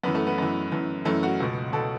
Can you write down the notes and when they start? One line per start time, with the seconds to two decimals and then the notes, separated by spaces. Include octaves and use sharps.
0.03 F#2 E3 B3
0.15 A3
0.27 B3
0.38 F#2 E3
0.72 F#2 E3
1.05 F#2 E3 A3
1.23 F#4
1.40 C#2 B2
1.73 B2 A4